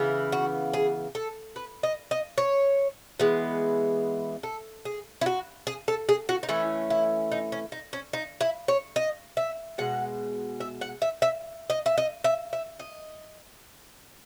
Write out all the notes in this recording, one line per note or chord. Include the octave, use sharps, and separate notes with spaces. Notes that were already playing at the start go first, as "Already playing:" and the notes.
Already playing: C#3 E3 B3
F#4
G#4
A4
B4
D#5
D#5
C#5
E3 G#3 B3
A4
G#4
E4
F#4
G#4
A4
G#4
F#4
D#4
E3 A3 C#4 E4
E4
D#4
C#4
D#4
C#4
D#4
E4
C#5
D#5
E5
B2 G#3 F#5
E5
F#5
E5
E5
D#5
E5
D#5
E5
E5
D#5